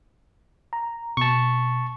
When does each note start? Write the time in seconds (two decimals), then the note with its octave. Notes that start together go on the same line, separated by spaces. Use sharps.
0.73 A#5
1.17 B2 A5 C#6